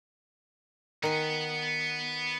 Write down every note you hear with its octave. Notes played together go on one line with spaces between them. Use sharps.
D#3 B3 F#5 G#5